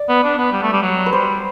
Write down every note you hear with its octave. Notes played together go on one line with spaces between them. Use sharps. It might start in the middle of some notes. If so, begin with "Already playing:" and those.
Already playing: D5
B3
D4
B3
G3
A3
G3
F#3
B4
G3 C5